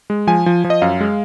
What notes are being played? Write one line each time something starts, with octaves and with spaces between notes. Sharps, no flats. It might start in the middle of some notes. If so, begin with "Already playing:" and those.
G#3
F3 G#5
F3
F3
D#5
F#2 F5
G#3